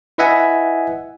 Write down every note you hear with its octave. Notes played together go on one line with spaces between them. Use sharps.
E4 B4 D#5 E5 F#5 G#5